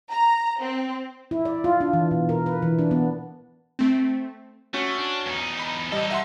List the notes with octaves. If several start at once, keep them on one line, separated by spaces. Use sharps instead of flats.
A#5
C4
E4
D5
F4
D4
E3
B2
A#4
B4
E3
D4
B3
A3 C4
A3 C#4 F#4
D4
E2 D#4
B5
A1 G3 D#4 A4 D#5
E5 F#5 C6